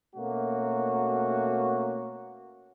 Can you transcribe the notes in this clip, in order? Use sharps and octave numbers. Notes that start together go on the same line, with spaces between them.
B2 A3 A#3 C#4 F#4